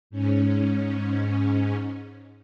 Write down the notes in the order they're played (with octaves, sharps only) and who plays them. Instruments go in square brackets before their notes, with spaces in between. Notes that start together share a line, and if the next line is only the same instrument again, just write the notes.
[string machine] G#2 C#4